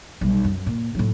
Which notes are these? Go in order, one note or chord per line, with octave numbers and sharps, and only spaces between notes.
B1 G3
F#2
A#2
A2 F#3